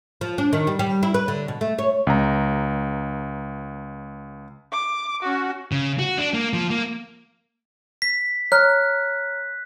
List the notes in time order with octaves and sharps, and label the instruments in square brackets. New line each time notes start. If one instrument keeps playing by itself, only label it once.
[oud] F3
D4
D#3
G3
G3
E4
B4
D3
B2
A3
C#5
[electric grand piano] C#2 A#5
[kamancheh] D6
C#4 F#4
[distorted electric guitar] C#3
F#4
D4
A#3
F3
A#3
[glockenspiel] B6
[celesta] C#5 A#5 F6 [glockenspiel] F#6